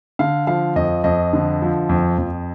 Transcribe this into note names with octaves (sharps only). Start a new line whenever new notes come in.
D3 F5
F3 F5
F2 D#5
F2 D#5
D3
F3
F2
F2